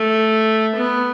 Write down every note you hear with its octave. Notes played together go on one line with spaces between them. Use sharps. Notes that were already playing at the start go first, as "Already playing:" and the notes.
Already playing: A3
B3